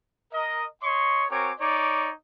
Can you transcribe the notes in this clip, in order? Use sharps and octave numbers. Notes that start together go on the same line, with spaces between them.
A#4 D#5
C#5 D#5 C6 C#6
C4 F#4 A#4 C#5 G#5 D6
D#4 C#5 D5 D6